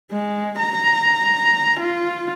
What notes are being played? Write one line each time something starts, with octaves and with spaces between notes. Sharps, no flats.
G#3
A#5
F4